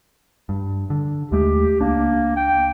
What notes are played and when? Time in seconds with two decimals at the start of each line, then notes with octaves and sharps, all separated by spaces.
0.49 G2
0.90 D3
1.32 D#2 G#3 A3 G4
1.81 C#2 A#3 D4
2.36 G5